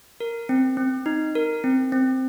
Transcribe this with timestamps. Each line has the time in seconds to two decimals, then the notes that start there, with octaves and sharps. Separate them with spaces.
0.20 A#4
0.49 C4
0.77 C4
1.06 D#4
1.35 A#4
1.64 C4
1.92 C4